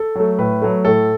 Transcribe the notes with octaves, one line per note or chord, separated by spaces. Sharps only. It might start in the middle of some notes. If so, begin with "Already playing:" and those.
Already playing: A4
F#3 A3
A2 B4
F#3 A3
A2 A4